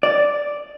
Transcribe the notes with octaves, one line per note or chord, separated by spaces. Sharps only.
D5